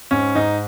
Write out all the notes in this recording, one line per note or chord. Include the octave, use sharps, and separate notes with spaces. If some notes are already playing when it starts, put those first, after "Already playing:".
G#2 C#4
G#2 D#4